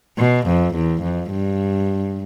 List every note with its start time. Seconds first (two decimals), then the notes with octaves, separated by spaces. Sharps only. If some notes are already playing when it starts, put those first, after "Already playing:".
0.18 B2
0.47 F2
0.75 E2
1.03 F2
1.31 G2